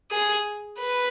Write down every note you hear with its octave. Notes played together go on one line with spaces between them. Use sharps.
G#4
B4